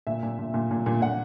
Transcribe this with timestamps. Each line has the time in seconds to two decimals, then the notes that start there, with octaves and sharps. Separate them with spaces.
0.07 A#2 E5
0.23 A#2
0.39 A#2
0.54 A#2
0.71 A#2
0.86 A#2
1.01 A#2 F#5